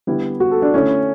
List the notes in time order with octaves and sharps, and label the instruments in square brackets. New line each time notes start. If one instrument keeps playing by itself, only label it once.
[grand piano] D3 G3 B3 E4
[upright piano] F#4
A4
D4
[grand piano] D3 A3 E4 [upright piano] C#4